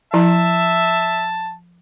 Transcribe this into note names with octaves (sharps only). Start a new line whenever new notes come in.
F3 E4 E5 A5 A#5